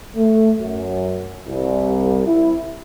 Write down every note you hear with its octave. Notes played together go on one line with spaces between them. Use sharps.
A3
F#2
C2
E4